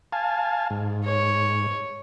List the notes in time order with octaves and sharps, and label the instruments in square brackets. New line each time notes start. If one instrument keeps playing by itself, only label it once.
[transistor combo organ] F5 G#5 A5
G#2
[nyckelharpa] C#5